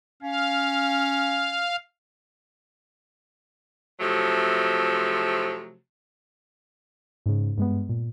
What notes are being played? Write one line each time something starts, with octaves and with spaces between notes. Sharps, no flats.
C#4 F5
C3 F3 F#3 A3
G#2 C#3
G2 G#3 B3
A#2